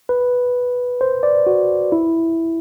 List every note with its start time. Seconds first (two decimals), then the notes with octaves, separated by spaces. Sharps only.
0.09 B4
1.01 C5
1.23 D5
1.47 F#4
1.92 E4